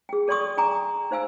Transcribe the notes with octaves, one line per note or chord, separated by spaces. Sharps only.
G#4 G5
A4 D5 G5 C6 C#6 D#6
G5 G#5 A#5 D6
D#4 C5 F5 G#5 E6